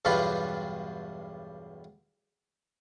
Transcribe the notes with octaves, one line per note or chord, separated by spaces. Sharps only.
B1 E2 G2 G3 F4 B4